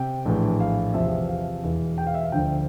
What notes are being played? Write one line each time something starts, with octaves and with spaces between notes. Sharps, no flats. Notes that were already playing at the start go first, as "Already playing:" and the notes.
Already playing: C3 G5
A#1 A2 E3
F5
E2 C3 F3 E5
F5
E1 E2 E3
G5
F5
E5
F5
D2 D3 F3 G5